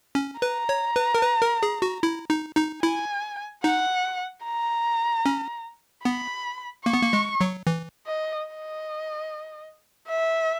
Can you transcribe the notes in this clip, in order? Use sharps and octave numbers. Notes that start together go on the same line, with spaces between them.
C#4
B4 A#5
C#5
B4
A#4
B4
A#4
G#4
F#4
E4
D#4
D#4
E4 G#5
D#4 F#5
A#5
C#4
B3 B5
A#3 C#6
B3
A#3
G#3
F#3
E3
D#5
D#5
E5